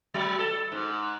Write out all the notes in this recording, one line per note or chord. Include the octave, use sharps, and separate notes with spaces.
F#3
A4
G#2